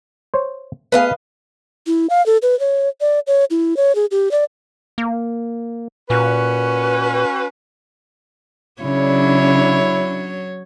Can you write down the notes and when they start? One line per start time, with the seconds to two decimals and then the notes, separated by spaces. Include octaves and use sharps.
0.34 C5 C#5
0.92 A3 B3 G#4 B4 D#5 F5
1.87 E4
2.10 F5
2.26 A4
2.42 B4
2.60 C#5
3.01 D5
3.27 C#5
3.51 E4
3.77 C#5
3.95 G#4
4.11 G4
4.31 D5
4.98 A#3
6.10 A#2 C#4 F#4 B4
8.82 C#3 F#3 D4 E4 C#5